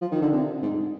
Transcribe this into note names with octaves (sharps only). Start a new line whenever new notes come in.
F3
D#3
D3
C3
G#2